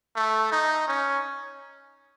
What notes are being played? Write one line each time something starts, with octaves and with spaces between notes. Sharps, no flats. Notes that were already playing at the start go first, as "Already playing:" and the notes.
A3
D#4
C#4